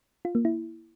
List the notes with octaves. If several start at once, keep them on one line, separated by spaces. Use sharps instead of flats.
F4
A#3
E4